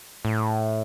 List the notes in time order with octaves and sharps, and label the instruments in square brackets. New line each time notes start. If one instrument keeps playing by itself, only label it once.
[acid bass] A2